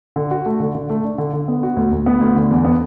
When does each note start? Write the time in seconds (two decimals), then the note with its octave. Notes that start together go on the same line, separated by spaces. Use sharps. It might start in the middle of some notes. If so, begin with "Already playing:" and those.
0.16 D3
0.31 F#4
0.46 A3
0.60 D3
0.75 D3
0.90 A3
1.04 D4
1.18 D3
1.33 D3
1.48 B3
1.63 F#4
1.77 D2
1.92 D2
2.06 B3
2.21 D2
2.36 D3
2.51 E2
2.65 B3